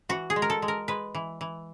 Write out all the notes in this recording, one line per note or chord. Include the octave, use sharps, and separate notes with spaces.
E3 F#4
G#4
G#3
A#4
A4
G#3
A#4
G#3 B4
E3
E3